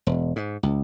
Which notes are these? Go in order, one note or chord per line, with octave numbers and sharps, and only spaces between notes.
E1
G#2
C#2